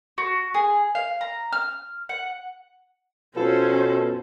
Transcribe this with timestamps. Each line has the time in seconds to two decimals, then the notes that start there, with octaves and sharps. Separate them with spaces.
0.18 F#4
0.54 G#4
0.95 F5
1.21 A#5
1.53 F6
2.09 F#5
3.36 B2 C#4 F4 F#4 A4 B4 C5